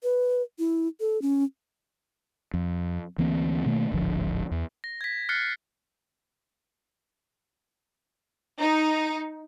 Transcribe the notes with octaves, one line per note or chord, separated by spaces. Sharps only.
B4
E4
A4
C#4
F2
D2 E3 A#3 C4
B2 D#3 A3 A#3
D1 G#1 D3 F3
E2
A#6
G#6 B6
F6 F#6 A6 C7 C#7
D#4